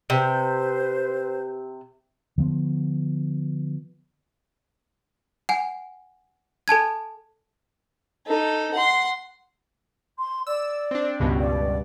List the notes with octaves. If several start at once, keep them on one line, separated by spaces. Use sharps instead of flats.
C3 B4 C5
D3 F3 B3
F#5 G#5
A4 G#5 A5 G#6
D#4 A4
F#5 C6
C6
D5 E6
C4 D4
C#2 G2 B2
D5